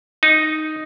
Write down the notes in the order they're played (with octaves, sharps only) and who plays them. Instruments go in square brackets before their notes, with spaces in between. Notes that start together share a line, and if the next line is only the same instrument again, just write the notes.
[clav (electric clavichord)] D#4